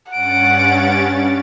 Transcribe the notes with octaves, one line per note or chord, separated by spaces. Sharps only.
G2 C#4 F#5 A6 D7